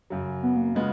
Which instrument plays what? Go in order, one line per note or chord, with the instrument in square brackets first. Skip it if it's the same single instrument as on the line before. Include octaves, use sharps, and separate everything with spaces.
[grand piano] F#2 C#3 F#3
[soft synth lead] B3
A#3
[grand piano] C#3 G#3 B3 F4